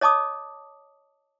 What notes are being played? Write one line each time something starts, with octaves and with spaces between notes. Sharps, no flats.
C#5 D#5 A5 D6 D#6